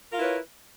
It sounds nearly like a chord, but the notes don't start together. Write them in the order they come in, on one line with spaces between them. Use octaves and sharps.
A#4 F4 E4 B4 C#5